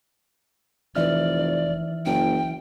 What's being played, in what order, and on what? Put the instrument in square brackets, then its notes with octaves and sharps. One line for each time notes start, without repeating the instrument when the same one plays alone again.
[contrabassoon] F1 [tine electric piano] E3 E5 F6 [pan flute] D5
[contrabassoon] F#1 [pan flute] G5